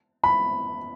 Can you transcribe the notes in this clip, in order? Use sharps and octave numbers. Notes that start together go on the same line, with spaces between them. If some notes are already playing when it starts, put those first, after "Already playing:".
B5